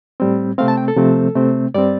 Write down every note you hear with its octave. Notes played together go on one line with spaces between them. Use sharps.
A2 G3 C4
C3 A3 C4 F5
A5
G5
A4
C3 F3 A3 C4
C3 A3 C4
G2 G3 C4 D5